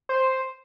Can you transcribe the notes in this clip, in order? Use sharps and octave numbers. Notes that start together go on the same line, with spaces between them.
C5